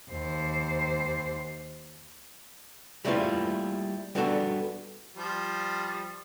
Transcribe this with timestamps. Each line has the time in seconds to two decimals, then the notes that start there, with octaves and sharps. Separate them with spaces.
0.10 D#2 C5
3.05 G3 A3 A#3 E4 F4 B4
4.15 G3 B3 D4 F#4 G#4 A4
5.16 F3 G3